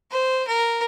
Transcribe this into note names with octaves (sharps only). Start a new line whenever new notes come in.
C5
A#4